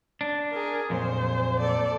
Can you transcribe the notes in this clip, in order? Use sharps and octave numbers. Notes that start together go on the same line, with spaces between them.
D4
G#4 A#4
F2 A#2 F#3 C5
A4 D5